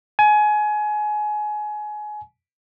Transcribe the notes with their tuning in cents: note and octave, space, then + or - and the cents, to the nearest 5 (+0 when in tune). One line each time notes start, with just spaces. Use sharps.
G#5 +25